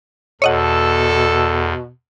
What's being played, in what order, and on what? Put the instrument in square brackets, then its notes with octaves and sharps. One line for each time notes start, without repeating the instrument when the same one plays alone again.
[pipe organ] E2 [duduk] B2 [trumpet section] A4 [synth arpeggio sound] C#5 D#5 F#5